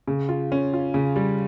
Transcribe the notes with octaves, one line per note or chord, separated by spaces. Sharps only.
C#3
F4
C#4
F4
C#3
G3